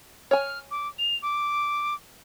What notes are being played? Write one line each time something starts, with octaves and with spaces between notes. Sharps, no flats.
C#5 G#5 F6
D6
F7
D6